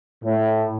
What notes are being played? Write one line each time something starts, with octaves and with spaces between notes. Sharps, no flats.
A2